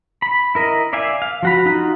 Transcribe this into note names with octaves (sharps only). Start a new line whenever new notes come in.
B5
E4 A#4 D#5
D5 E5 F5 G#5
F5
F3 F#4 B5
D#4 F4 F#4